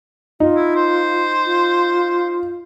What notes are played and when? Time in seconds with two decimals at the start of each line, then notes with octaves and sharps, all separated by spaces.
0.40 D#4 F4
0.56 E4
0.76 C5
1.46 F4